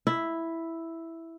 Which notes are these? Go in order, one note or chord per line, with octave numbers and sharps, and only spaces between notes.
E4